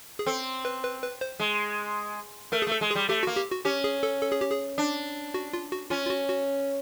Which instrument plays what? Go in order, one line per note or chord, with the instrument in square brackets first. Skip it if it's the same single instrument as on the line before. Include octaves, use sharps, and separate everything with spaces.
[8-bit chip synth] G#4
[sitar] C4 [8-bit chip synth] A4
[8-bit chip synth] B4
B4
B4
C5
[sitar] G#3
[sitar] A3 [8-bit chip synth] A#4
[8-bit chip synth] G#4
[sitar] A3
[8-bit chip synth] A4
[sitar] G#3
[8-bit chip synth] G#4
[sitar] G3
[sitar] A3 [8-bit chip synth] G4
[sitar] A#3 [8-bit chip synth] F#4
[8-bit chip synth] G4
F#4
[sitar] C#4 [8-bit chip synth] G4
[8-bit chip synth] G#4
A4
A4
G#4
G4
G#4
[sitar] D4
[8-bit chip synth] F#4
F4
F#4
[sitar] C#4 [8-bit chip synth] F4
[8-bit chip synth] F4
F#4
F#4